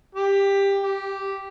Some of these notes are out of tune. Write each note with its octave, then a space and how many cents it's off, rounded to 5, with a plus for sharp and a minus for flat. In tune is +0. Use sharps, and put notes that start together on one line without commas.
G4 +15
G4 -10